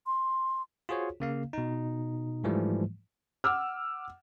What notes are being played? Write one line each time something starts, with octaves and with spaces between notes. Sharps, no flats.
C6
F4 F#4 G#4 C5 C#5
C#3 A#3 F5
B2 D#4
G#2 E3 F3 G3 A3
F#5 D6 E6 F6